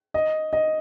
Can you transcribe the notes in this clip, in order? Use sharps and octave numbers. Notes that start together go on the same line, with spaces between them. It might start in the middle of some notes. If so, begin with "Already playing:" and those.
D#5
D#5